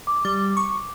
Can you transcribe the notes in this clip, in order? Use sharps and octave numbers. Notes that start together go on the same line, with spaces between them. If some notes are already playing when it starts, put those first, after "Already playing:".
D6
G3
C#6